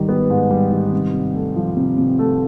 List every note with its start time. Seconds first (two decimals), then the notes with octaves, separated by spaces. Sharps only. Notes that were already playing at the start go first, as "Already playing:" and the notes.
Already playing: G#2 D#3 G3
0.09 B3
0.30 G#2
0.50 G3
0.72 D#3
0.93 C3
1.13 C3
1.35 A3
1.56 F3
1.77 C3
1.98 C3
2.19 A3